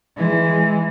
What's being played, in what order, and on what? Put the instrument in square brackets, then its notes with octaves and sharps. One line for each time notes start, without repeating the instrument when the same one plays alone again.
[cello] E3 G#3